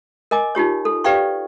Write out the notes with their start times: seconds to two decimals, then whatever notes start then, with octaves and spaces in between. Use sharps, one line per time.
0.31 A#4 D#5 G#5 D6
0.55 D#4 F4 G4 C#5
0.85 A4
1.04 G4 B4 D5 F5 G5 C#6